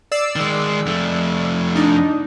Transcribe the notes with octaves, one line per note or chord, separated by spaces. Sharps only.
D5 E6 C7
D#3 G#3
F2 A3
D4 D#4